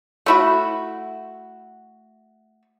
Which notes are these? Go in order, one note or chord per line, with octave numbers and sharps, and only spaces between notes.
A3 E4 F#4